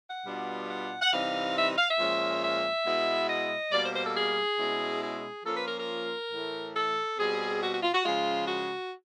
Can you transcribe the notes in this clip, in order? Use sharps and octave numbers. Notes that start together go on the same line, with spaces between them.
F#5
B2 G3 B3 D4 F4
F#5
F#5
C3 E3 G3 C4 D#4 F5
E5
F5
E5
A#2 F3 G#3 C#4
E5
B2 G#3 B3 E4
D#5
B2 G3 A#3 D5
C5
C5
A4
G#4
B2 G#3 C#4 E4
G#4
F3 A#3 C#4 F4 A4
B4
A#4
A#4
A2 E3 A3
A4
B2 G3 C4 G#4
F#4
F#4
F4
F#4
C#3 F3 G#3 F4
F#4